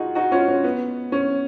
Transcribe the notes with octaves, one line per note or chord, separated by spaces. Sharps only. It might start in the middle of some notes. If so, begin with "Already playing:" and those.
Already playing: D#4 F4 F#4 G#4
D#4 F#4
C#4 F4
C#4
B3
C#4